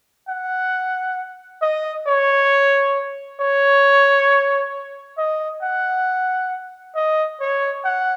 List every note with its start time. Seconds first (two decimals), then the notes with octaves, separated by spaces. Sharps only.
0.29 F#5
1.62 D#5
2.08 C#5
3.41 C#5
5.18 D#5
5.63 F#5
6.96 D#5
7.41 C#5
7.85 F#5